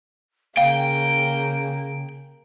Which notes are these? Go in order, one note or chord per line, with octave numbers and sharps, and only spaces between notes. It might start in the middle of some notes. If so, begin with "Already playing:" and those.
C#3 A#3 F5 G5